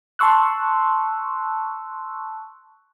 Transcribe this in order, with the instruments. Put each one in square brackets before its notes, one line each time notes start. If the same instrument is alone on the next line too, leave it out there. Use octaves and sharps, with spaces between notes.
[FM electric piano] A5 C6 C#6 E6 F#6